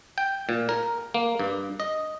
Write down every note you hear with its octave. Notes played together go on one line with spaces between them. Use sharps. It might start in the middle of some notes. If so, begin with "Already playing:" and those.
G5
A#2
A#4
A#3
G2
D#5